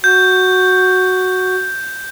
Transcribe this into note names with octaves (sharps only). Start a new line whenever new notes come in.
F#4 G6